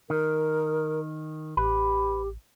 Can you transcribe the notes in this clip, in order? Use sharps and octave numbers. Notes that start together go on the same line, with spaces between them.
D#3 A#4
A1 G4 B4